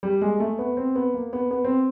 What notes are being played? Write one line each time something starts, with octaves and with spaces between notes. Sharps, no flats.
G3
G#3
A3
B3
C4
B3
A#3
B3
B3
C4